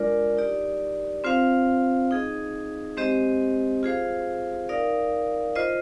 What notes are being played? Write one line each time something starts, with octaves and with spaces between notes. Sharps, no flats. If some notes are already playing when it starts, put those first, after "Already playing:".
Already playing: G#3 D4 F4 A#4 D5
D#4 G4 D5
C4 F4 C5 F5
D#4 G#4 D#5
G#3 C4 G4 C5 D#5
F4 G#4 C5 F5
D#4 A#4 D5 F5
F4 C5 D#5